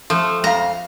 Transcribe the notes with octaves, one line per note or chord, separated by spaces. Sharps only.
F3 A3
F2 F5 A#5